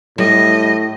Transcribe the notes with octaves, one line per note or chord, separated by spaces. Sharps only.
A2 G3 D#5